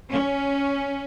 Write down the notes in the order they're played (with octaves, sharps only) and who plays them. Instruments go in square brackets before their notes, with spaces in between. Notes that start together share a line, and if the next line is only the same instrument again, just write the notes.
[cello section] C#4